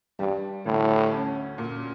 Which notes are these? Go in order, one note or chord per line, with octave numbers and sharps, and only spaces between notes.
G2 G3
D2 A2
C#4
A#2